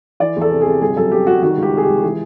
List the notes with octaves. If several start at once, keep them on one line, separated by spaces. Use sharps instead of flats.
E3 D5
E2
A4
C3
C3 G#4
G1 G#4
F#2 A4
G1 G4
G3 F#4
D#3 F#4
C#2
G4
C3 G#4
G4
C#2
E3 G#4